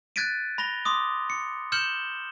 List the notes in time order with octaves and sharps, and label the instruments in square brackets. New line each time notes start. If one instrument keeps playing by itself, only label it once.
[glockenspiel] F#6 G#6 A6 B6 D7 D#7
B5 A#6 F7 G7
C6 D6 D#6
C#7
F6 G6 C#7 E7 F#7 G7